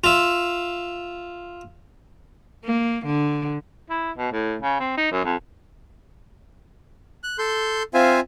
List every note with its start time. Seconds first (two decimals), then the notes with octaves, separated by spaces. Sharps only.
0.04 F4 E5
2.64 A#3
3.06 D3
3.90 E4
4.17 B2
4.32 A2
4.62 C#3
4.80 C4
4.97 D#4
5.12 F#2
5.25 F2
7.24 F#6
7.38 A4 C6 G6
7.94 C4 F4 C5 E5 F5 G#5